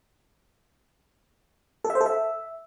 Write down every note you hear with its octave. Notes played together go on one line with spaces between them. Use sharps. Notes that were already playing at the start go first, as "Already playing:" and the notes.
A4
E5
C5
A4
E5